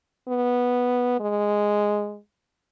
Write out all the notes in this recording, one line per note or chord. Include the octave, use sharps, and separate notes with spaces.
B3
G#3